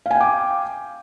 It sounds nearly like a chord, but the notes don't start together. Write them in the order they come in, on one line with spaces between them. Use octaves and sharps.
F5 G#5 G5 D6